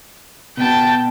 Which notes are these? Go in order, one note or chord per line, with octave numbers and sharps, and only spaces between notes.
B2 G5 A5